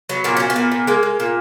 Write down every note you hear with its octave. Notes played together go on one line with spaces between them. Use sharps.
F#3 B3
A#2 B3
A#2 C#4
B3
A#2
A#2
G#3 A#3
G#3
A#2